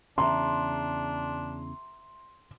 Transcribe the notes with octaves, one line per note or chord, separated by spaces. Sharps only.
E2 C#3 D4 E5 A#5 C6